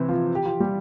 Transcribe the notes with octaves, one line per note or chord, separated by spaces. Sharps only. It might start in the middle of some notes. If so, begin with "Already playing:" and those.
Already playing: C3 E3 C4 E4
F3 F4
G4
F3 F4
G3 G4